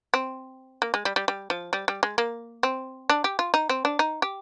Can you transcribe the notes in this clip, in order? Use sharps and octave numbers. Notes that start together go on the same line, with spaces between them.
C4
A#3
G#3
G3
G3
G3
F3
G3
G3
G#3
A#3
C4
D4
G4
F4
D#4
C4
D4
D#4
G4